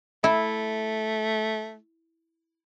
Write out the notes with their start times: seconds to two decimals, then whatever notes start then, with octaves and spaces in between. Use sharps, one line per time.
0.24 A3 E4